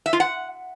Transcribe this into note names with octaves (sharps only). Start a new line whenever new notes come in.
E5
F4
F#5